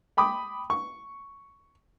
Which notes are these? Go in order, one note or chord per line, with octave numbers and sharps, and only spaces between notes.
G5 B5 D6 D#6
C#6